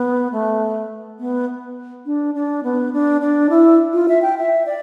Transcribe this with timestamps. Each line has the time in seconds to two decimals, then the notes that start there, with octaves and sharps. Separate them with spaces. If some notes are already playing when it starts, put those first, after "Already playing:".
Already playing: B3
0.32 A3
1.19 B3
2.06 D4
2.35 D4
2.64 B3
2.93 D4
3.21 D4
3.50 E4
3.94 F4
4.09 E5
4.22 G5
4.37 E5
4.66 D5